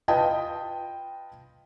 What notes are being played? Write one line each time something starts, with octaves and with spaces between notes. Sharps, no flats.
F4 B4 D#5 G5 A5